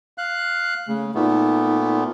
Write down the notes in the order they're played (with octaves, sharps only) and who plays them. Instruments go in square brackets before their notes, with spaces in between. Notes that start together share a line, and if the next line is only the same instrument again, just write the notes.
[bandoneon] F5 F#6
[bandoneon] C#3 [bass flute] A3
[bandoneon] A#2 A3 B3 [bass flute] D#4